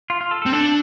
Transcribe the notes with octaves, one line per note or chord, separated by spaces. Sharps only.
F4
F4
A4
A4
C4
D4 A4